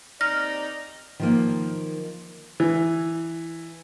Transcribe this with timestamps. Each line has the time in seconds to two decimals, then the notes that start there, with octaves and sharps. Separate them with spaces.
0.21 D#2 C4 D#4 D5 F6 A#6
1.19 D#3 F3 A#3
2.60 E3